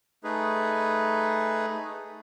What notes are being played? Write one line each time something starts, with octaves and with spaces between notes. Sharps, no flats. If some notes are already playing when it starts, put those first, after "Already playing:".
A3 D#4 G#4 B4